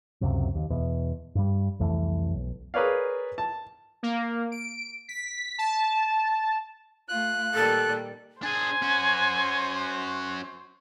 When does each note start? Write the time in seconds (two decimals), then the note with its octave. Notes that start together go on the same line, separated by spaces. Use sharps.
0.21 C#2 F#2 C3
0.55 D#2
0.70 E2 B2
1.35 G2 G3
1.79 C2 F2 E3 A3
2.33 B1
2.74 G#4 A#4 B4 C#5 D5 F5
3.38 A5
4.03 A#3
4.52 D7
5.09 B6
5.58 A5
7.09 A3 F4 F#6
7.54 A#2 D#3 G3 A4
8.43 D4 G#4 C5 G#5
8.82 C#4 F#4